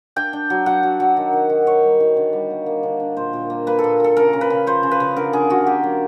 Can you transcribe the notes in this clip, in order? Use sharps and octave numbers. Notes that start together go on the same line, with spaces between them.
D4 G5
D4
F#3
F#3 F#5
F#3
F#3
D#3
D#3
D#3
D#3 C#5
G3
D#3
D3
G3
A#3
A#3
D3
D4
A#2 C5
A#2
A#3
A#3 B4
A4
A#2
A#2 A4
C#3 A#4
C#3
B4
C#3
F3 C5
C#3
B4
C#3
D3 A#4
D3 G#4
D3 F#4
A#3 G4
F#3